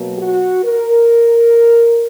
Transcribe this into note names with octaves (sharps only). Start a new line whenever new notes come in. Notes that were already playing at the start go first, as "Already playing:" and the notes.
Already playing: B2 F#3 A#3
F#4
A#4